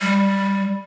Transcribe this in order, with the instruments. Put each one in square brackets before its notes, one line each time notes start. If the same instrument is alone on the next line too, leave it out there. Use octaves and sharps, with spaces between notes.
[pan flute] G3